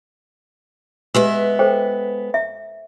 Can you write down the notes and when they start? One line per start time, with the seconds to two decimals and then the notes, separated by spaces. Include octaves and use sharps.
1.14 G#3 B3 G4 B4 E5 E6
1.59 A4 C5 G5
2.34 E5